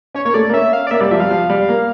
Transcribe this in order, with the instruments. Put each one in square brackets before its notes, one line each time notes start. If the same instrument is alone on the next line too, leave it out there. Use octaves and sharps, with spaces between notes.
[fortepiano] C#4 [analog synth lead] C#5
[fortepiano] A#3 [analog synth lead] C#5
[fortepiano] A3 [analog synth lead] D5
[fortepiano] A#3
[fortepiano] C#4 [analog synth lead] E5
[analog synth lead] F5
D5
[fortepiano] A#3 [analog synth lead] E5
[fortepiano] G3 [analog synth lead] D5
[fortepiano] F3 [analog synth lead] E5
[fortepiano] G3 [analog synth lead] F5
[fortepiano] F3
G3
A#3